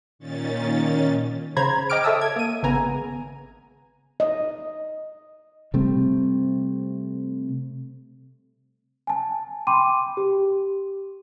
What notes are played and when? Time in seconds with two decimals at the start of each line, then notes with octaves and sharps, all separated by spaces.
0.19 A#2 D#3 C#4 A6
1.57 C#3 C5 A#5 B5 G#6
1.90 D#5 G5 D6 F6 D7
2.04 A4 C#5 E5 A5 D#6 E6
2.21 G#6
2.36 A#3 D#7
2.63 G#1 C#3 B3 G#5 A#5
4.20 D#5
5.74 C3 G3 A3 C4
9.07 G#5 A5
9.67 G5 B5 C6 D6 D#7
10.17 G4